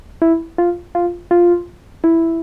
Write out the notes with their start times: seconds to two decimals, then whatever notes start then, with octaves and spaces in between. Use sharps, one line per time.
0.22 E4
0.58 F4
0.95 F4
1.31 F4
2.04 E4